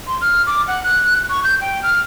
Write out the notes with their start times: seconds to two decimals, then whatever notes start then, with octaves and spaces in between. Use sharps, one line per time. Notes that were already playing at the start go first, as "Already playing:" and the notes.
0.07 C6
0.21 F6
0.47 D6
0.68 F#5
0.84 F#6
1.30 C#6
1.44 G6
1.61 G5
1.83 F6